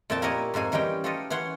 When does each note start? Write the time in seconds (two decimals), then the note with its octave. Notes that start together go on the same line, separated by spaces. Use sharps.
0.10 F2 A#2 E4 E5 G5 A5
0.22 A#3 E4 G4 A#4 C#5 D#5
0.54 F2 G#2 A#3 G#5
0.72 E3 G3 G#3 C#4 D#4 G5
1.04 F4 G4 A4 B4 C#5 D#5
1.30 E3 C#4 C#5 F#5 C6